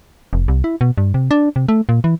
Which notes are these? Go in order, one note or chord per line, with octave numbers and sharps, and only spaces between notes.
F1
C2
E4
B2
G2
C3
D4
C3
A3
A#2
E3